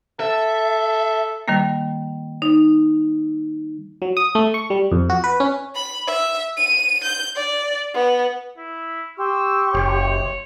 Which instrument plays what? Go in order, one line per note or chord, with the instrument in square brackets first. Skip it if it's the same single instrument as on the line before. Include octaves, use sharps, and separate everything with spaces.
[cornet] A4 [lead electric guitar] E5
[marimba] D#3 G3 A#3
D#4
[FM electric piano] F#3
D#6
A3
C#6
G3
F2
F#4
B4
C#4
[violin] B5
E5
D#7
G6
D5
B3
[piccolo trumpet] E4
[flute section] G4 C6 C#6 [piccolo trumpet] E6
[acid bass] F#1 [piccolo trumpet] C#5